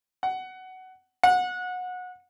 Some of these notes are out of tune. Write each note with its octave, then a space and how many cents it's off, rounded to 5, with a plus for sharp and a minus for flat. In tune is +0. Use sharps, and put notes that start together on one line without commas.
F#5 +15
F#5 -25